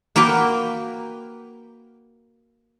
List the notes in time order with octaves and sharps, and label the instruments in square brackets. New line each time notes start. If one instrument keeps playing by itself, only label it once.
[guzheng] A#3 F#4 B4 G5